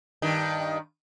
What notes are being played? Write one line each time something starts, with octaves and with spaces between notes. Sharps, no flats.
G2 D#3